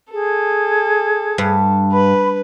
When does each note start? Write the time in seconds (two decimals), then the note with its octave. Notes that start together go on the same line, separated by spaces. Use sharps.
0.12 G#4 A4
1.38 G2
1.92 B4 B5